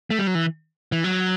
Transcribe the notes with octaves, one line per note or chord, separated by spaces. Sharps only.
A3
G3
F#3
E3
E3
F#3